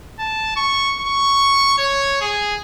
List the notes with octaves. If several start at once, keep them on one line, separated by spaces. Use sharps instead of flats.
A5
C#6
C#6
C#5
G#4